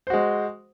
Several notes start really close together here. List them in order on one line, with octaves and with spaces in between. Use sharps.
C5 F#4 G#3